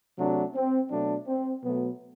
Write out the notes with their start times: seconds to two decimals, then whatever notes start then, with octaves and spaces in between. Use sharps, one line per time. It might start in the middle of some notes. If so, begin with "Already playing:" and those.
0.18 C3 F#3 A3 D4
0.54 C4
0.90 B2 F#3 A3 D4
1.27 C4
1.63 B2 F#3 A3 B3